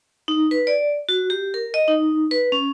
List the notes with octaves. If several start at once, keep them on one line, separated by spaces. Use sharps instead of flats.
D#4
B4
D5
F#4
G4
A#4
D#5
D#4
B4
C#4